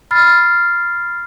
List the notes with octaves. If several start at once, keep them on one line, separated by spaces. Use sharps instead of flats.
B5 F6 A6 C7